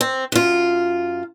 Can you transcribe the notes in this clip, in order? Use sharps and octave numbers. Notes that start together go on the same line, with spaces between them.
C4
F#2 F4